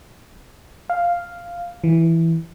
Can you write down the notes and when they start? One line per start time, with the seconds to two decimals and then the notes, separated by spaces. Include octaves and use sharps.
0.90 F5
1.84 E3